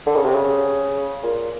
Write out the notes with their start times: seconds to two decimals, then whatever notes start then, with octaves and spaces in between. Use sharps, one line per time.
0.06 D3
0.16 C#3
0.25 C3
0.35 C#3
1.23 A#2